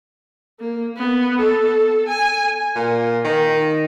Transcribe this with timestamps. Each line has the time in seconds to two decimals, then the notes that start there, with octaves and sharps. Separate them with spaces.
0.59 A#3
0.97 B3
1.39 A4
2.08 G#5
2.75 A#2
3.25 D#3